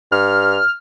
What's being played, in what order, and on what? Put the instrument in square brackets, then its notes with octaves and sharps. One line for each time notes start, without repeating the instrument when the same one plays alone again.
[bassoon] G2 [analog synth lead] F6